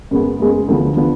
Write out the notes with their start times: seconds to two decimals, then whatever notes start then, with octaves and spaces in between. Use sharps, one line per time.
0.11 F#2 C#3 G#3 B3
0.40 F#2 C#3 G#3 B3
0.68 D2 D3 F3 B3
0.97 D3 F3 B3